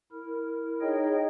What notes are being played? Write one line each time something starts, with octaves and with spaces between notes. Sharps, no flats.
E4 A#4
D#4 G#4 C#5 D#5 G5